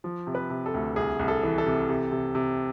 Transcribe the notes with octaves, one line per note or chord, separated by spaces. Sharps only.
F3
C3
B4
C3
A4
D2
C2 G#4
C2
A4
E3
A4
C3
C3
C3
C3